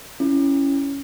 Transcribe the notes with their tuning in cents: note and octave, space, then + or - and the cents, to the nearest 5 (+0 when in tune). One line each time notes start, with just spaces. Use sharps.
C#4 +0 E4 +5